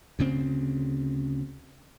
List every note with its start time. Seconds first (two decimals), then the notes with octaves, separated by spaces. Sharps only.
0.19 D2 C#3 C4